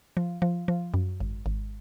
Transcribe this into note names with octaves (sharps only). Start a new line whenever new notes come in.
F3
F3
F3
F#2
G#1
G#1